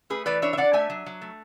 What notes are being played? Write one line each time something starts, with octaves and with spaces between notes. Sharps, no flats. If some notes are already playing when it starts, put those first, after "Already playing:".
A3 G#4 B4
E3 B4 D5
D4 C#5 E5
E5
D4 D5 F#5
A3 E5 G#5
F#3
F#3
A3